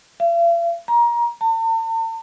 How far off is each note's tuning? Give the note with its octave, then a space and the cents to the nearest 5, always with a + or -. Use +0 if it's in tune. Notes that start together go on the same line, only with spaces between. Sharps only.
F5 -45
A#5 +25
A5 +45